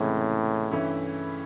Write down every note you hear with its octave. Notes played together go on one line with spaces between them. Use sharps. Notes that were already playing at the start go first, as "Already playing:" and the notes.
Already playing: C#2 A2 C3 E3 G#3 C#4
G2 E3 A3 C#4 E4